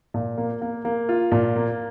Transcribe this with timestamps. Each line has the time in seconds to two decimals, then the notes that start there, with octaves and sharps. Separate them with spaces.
0.14 A#2
0.37 A#3
0.62 A#3
0.85 A#3
1.09 F4
1.32 A#2
1.56 A#3